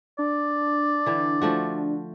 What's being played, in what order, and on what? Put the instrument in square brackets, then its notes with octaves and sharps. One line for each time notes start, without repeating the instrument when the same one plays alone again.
[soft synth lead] D4 [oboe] D5
[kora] D3 E3
F3 A3 F#4